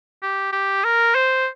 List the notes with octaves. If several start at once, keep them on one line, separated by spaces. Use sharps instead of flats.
G4
G4
A#4
C5